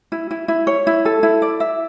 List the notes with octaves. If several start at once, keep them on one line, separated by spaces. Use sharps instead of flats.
E4
E4
E4
C#5
E4
A4
E4
D5
E5